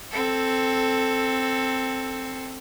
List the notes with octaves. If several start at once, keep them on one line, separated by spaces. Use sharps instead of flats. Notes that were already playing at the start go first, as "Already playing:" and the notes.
C4 A4